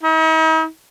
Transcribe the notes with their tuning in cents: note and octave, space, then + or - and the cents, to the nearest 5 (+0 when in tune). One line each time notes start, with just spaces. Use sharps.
D#4 +45